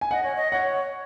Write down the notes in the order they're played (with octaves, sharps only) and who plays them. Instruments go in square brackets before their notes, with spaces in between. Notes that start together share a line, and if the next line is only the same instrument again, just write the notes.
[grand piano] G#5
[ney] D#5 [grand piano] F#5
[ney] C#5
D#5
[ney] C#5 [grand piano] F#5